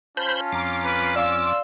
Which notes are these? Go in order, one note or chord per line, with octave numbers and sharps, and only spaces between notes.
C#4 F4 C5 A5 B5 G6
F2 A#5 D6 C7
B4
D5 F5 C6 E6